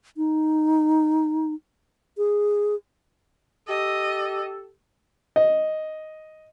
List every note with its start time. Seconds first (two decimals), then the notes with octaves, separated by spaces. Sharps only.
0.17 D#4
2.17 G#4
3.68 G4 A4 D#5
5.36 D#5